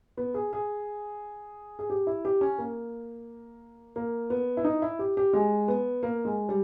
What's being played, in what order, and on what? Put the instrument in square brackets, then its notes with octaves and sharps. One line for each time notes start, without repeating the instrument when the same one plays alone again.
[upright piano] B3
G#4
G#4
G#4
G4
E4
G4
C#4
A#3
A#3
B3
E4
D#4
E4
G4
G4
G#3
B3
A#3
G#3
G3